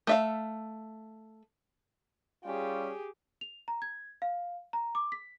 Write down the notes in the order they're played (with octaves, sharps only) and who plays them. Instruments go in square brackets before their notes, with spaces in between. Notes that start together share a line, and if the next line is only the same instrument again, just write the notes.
[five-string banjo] A3 E5 F5
[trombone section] G3 C#4 F4 [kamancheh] G4 G#4
[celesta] F7
A#5
G#6
F5
A#5
D6
B6